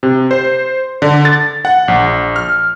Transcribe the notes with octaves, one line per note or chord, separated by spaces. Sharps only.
C3
C5
D3
A6
F#5
A#1
F6